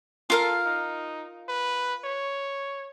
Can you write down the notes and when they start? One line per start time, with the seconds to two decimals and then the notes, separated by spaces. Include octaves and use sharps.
0.30 F4 A4 A#4 F5
0.65 D#4
1.48 B4
2.04 C#5